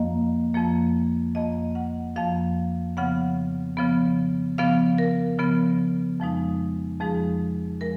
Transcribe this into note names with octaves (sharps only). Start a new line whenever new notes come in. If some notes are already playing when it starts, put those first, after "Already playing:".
Already playing: F2 F3 A#3 D#5
F2 F3 A#3
F2 F3 A#3 D#5
F#5
F2 F3 A#3 F5
C#3 F3 B3 F#5
C#3 F3 B3
C#3 F3 B3 F5
A#4
C#3 F3 B3
F2 F3 G#3 D#4
F2 F3 G#3 D#4 G#4
F3 G#3 A#4